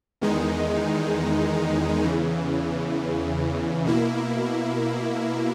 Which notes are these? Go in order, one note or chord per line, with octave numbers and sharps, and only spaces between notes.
E2 D#3 G#3 D#4
E2 C#3 E3
B2 A#3 E4